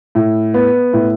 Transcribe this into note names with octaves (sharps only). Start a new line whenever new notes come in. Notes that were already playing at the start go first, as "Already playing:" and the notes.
A2
B3
A2